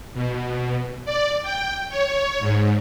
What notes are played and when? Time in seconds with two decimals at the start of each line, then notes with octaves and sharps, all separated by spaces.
0.14 B2
1.05 D5
1.42 G5
1.89 C#5
2.40 G#2